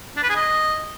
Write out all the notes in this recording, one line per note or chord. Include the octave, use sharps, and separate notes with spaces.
D4
B4
G#4
D#5